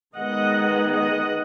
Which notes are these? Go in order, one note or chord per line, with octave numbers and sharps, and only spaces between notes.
D#3 G#3 B3 D#5 F#5
D#5 F#5